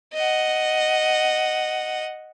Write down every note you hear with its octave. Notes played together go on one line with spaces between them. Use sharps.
D#5 F#5